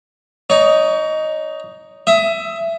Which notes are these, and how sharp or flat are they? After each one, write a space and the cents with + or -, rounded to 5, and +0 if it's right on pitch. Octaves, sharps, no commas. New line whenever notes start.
D#4 +0 C#5 +30
E5 +15 D#6 +30